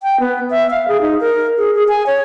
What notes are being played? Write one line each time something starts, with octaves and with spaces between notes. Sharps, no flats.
G5
B3
E5
F5
G#4
D#4
A#4
G#4
G#4
G#5
C#5